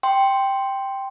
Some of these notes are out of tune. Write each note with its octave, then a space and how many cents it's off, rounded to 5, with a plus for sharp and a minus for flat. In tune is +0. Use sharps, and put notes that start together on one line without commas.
G5 +0 C6 +0